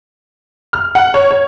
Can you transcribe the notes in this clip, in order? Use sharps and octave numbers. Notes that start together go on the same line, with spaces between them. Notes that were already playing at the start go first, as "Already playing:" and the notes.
F6
F#5
C#5
C#5